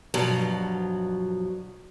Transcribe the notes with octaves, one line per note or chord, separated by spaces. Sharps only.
G2 B2 F3 F#3